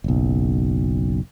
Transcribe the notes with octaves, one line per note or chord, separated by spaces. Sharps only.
F#1 B1